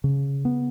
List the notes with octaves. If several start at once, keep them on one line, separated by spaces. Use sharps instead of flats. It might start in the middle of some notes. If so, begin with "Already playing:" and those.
C#3
B3